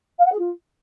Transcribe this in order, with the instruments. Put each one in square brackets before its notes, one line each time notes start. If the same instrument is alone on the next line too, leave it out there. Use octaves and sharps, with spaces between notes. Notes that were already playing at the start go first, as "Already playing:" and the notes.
[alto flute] F5
F#5
G#4
F4